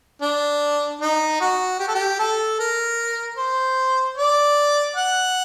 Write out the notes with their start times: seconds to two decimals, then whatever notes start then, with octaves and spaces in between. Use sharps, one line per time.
0.22 D4
1.01 D#4
1.41 F#4
1.80 G4
1.88 A4
1.95 G4
2.19 A4
2.59 A#4
3.37 C5
4.17 D5
4.96 F#5